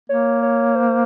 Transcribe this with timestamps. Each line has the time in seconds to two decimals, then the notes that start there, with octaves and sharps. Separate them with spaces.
0.09 A#3 C#5
0.43 C#5
0.76 C5